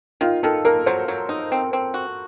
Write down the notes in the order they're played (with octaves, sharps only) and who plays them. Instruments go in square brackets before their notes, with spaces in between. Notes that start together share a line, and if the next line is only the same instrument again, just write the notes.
[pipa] D#3 [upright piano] F4
[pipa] D#3 [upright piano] A4
[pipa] A#3 [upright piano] A#4
[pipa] F#3 [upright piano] C5
[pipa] F#3
D#4
C4
C4
F#4